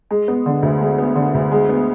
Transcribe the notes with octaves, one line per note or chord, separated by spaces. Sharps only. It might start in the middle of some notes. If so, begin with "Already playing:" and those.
G#3
B3
D3
D2
G#3
B3
D3
D2
G#3
B3